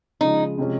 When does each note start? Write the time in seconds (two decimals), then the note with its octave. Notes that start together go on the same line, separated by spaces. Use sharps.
0.21 C#3 F3 G#3 D#4
0.58 C3 F3 G#3 C#4